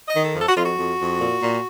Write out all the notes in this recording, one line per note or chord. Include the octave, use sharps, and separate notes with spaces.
D#3 D#5
A4
F2
A4
F#4
F2 F4
F#4
F2
F2
A#2
A#2